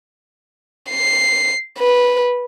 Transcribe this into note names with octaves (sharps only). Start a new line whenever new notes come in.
C7
B4